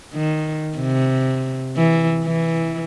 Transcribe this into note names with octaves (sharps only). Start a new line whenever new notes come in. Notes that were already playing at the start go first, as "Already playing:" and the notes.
D#3
C3
E3
E3